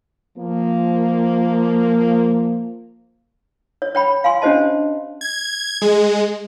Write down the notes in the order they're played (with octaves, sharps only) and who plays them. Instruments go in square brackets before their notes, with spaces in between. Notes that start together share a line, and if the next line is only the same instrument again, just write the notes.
[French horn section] F3 A#3
[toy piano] C#5
C#5 G5 B5
F5 G#5 C6
C#4 D4 G4 C5 D#5 A5
[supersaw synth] G#6
G#3